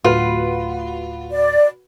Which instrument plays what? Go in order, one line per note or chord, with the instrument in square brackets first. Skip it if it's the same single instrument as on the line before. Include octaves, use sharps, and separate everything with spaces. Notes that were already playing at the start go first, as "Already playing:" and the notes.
[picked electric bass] D1 A2 [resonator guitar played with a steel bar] F4 [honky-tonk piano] F#4 B4
[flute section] D5